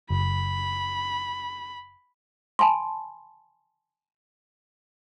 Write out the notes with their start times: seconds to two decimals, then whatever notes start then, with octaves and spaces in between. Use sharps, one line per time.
0.10 F#1 B5
2.59 G#5 A5 B5 C6